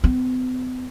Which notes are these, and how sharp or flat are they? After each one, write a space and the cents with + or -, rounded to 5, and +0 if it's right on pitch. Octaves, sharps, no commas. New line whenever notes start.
B3 +45